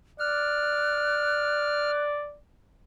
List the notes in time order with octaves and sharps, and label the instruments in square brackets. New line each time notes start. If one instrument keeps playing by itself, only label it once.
[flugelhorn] D5 [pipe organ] F6 [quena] F#6